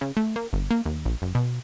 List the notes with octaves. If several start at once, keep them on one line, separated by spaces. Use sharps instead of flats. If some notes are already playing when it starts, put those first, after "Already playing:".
C#3
A3
A#3
G1
A#3
D#2
A#1
F#1
B2